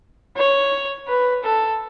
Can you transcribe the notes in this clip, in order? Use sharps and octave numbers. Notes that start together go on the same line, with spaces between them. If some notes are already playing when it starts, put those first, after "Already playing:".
C#5
B4
A4